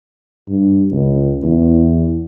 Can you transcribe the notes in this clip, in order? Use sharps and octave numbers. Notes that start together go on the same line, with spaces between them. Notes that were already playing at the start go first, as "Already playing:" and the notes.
G2
C#2
E2